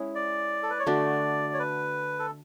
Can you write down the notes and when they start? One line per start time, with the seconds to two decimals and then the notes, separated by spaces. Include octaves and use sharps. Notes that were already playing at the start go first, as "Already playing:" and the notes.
Already playing: G#3 C#4 E4 G#4
0.15 D5
0.63 A4
0.70 B4
0.79 C#5
0.86 D3 A3 D4 F#4 D5
1.54 C#5
1.59 B4
2.19 A4